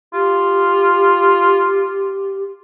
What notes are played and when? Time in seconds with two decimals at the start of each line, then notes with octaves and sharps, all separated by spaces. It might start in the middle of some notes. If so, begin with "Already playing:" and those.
0.14 F4 G4